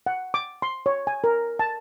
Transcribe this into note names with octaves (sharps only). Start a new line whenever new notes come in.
F#5
D6
C6
C#5
G#5
A#4
A5